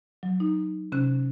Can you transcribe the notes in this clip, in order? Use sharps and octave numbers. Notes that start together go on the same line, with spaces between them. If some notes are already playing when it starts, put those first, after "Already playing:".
F#3
D#4
C3 C#4 F#6